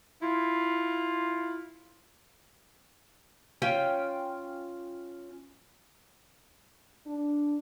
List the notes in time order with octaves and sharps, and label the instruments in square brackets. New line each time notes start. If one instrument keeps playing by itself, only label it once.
[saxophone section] E4 F4
[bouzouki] C#4 F4 G5
[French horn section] D4